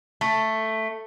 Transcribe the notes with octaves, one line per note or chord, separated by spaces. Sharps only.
A3